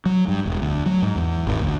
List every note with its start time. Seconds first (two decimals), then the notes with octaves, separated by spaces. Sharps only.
0.06 F#3
0.28 G2
0.46 E1
0.62 D2
0.86 F#3
1.02 G#2
1.16 E2
1.47 G#1
1.61 D2